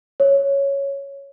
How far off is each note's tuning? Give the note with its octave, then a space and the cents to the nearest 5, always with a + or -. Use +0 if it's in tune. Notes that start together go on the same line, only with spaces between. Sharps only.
C#5 +0